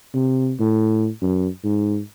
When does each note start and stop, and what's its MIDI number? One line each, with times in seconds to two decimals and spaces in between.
0.14 0.53 48
0.60 1.08 45
1.22 1.48 42
1.64 1.99 44